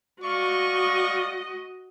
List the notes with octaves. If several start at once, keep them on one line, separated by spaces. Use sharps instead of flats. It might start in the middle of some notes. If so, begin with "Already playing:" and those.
F#4 D5 D#5 F5 C#6